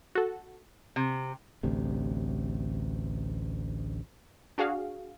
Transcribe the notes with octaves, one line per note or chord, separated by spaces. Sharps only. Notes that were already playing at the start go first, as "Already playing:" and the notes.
F#4 A4
C3
A1 D2 C3
D4 F#4 G#4 F5